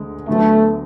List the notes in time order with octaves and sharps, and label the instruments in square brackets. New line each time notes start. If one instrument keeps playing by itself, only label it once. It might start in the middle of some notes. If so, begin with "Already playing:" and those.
Already playing: [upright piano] D2 D3 G#3
[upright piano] D2 D3 F#3 B3 [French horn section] A3